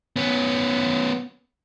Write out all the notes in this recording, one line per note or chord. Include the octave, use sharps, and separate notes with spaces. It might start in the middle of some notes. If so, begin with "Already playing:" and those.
B3 C#4